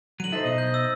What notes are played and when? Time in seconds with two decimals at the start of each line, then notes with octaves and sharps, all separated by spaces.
0.20 D3 F#3 D#7 F#7
0.32 D#4 A4 C5 E5
0.45 B2 D#5
0.58 G6
0.74 E6 A6